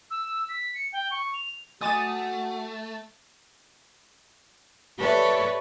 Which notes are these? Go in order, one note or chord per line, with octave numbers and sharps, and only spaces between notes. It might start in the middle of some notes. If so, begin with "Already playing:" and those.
E6
B6
C#7
G5
C#6
F7
A3 F#4 D#5 G#5 D6 D#6 A6 D#7
G4 A4 B4 C#5 D5 E5